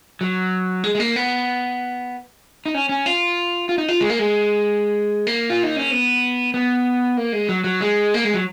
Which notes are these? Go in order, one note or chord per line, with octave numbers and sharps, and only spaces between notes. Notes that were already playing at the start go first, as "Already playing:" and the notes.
F#3
G#3
G#3
A#3
B3
D#4
C#4
C#4
F4
F4
D#4
F4
G#3
A#3
G#3
A#3
F4
D#4
C#4
B3
B3
A#3
G#3
F#3
F#3
G#3
A#3
G#3
F#3